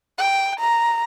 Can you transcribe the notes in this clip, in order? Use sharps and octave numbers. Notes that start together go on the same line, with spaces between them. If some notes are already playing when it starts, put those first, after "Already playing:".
G5
A#5